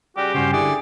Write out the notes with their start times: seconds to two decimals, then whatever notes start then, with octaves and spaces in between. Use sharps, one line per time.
0.17 C#3 G3 F#4 G4
0.34 G2 C#3 C#4 F#4 C5
0.53 D3 E4 G4 G#4 D5